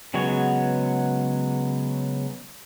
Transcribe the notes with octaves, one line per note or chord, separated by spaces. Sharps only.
C#3 F#3 G#3 B3 C#5